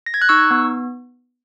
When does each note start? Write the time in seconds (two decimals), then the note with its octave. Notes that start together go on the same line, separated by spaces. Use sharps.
0.06 A#6
0.14 G#6
0.22 F#6
0.29 D#4 C#6 E6
0.50 B3